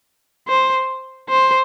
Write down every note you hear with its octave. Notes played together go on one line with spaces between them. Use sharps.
C5
C5